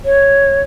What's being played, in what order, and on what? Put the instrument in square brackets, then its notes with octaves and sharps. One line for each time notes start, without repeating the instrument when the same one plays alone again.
[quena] C#5